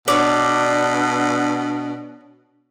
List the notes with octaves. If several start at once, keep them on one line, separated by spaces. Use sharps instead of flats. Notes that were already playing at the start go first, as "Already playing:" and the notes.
B2 D4 C#5 D5